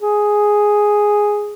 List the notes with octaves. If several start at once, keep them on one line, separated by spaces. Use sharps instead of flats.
G#4